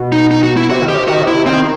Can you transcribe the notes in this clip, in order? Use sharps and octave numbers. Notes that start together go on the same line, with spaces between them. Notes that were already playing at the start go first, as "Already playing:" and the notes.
Already playing: B2
D#4
D#4
F#4
E4
C3 F#4
D#3
G4
C3
D#3 F#4
C3
E4
D#3 C4